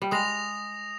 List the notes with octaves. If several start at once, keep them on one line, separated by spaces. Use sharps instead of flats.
G3
G#3 D#6 A#6 F7